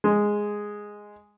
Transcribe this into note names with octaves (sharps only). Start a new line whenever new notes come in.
G#3